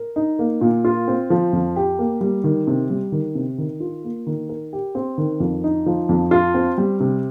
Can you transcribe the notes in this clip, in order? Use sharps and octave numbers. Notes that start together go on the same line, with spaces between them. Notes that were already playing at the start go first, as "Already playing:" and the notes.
Already playing: A#4
D#4
A#3
A#2
F4
C4
F3
F2
G4
A#3
G3
D#3
C3
G3
D#3
C3
D#3
F4
A#3
D#3
A#4
G4
C4
D#3
F2
D#4
F3
F2
F4
C4
G3
C3